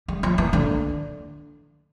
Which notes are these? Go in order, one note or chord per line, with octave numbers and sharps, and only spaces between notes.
G3
F3
E3
D3